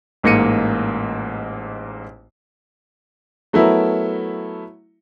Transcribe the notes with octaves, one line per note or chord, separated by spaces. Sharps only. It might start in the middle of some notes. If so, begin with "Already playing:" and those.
A1 G#2 A#3 A#6 C#7 D#7
F#3 A3 B3 E4 A#4 E5